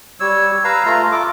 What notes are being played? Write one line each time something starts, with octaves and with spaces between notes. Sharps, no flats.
G3 C#5 E6
B4 F5 A#5 E6
A3 F4 A#5
F4 A4 D6